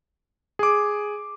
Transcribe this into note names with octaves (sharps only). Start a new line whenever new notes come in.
G#4 D6